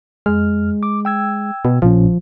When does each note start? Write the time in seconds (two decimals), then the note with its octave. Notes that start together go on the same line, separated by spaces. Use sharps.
0.26 F2 G#3 F6
0.83 D6
1.05 G5 E6 G#6
1.65 B2
1.82 A#1 A#2 F3 C#4